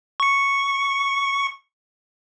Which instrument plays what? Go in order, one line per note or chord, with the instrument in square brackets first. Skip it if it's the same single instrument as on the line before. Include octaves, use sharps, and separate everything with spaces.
[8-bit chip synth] C#6 C#7